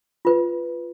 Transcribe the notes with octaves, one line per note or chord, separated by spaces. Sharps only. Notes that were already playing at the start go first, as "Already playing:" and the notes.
F4 B4